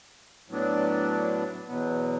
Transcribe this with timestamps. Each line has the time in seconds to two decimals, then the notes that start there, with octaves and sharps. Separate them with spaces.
0.49 A2 F#3 B3 D4
1.68 E2 B2 F#3 B3